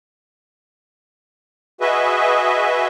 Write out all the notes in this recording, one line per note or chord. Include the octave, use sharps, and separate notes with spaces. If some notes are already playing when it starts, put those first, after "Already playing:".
F#4 G#4 B4 D#5 E5